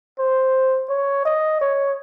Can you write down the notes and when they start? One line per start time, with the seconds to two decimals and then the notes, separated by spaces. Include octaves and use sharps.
0.19 C5
0.89 C#5
1.25 D#5
1.61 C#5